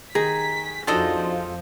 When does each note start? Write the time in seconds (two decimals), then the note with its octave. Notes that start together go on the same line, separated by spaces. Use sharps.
0.15 D#3 G#4 A#5 B6
0.87 F2 F3 D4 D#4 F4 F#4 A4 D#5